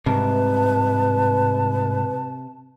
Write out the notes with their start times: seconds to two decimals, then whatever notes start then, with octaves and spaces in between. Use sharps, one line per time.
0.06 C2 G#2 C3 B4 A5